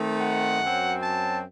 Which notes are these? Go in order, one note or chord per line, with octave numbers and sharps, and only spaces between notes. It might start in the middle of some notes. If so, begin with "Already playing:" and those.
Already playing: D#3 A3 C4 D#4
F#5
F#2 F#3 C4
A5